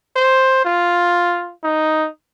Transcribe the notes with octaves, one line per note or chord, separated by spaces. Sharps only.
C5
F4
D#4